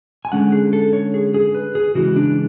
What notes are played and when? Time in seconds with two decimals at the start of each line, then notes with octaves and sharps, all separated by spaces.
0.25 G#5
0.32 D3 G#3 C#4 F#5
0.52 G#4
0.73 A4
0.93 C#5
1.14 G#4
1.34 G#4
1.55 B4
1.75 G#4
1.95 C#3 E3 G#3 F#4
2.16 D4